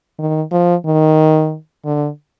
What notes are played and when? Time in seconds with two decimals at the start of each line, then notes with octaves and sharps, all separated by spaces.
0.19 D#3
0.52 F3
0.86 D#3
1.85 D3